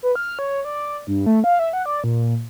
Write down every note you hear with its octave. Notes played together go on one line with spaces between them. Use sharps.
B4
F6
C#5
D5
G2
A3
F5
E5
F#5
D5
A#2